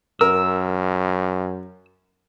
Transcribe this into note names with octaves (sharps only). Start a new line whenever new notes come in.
F#2 A#4 E6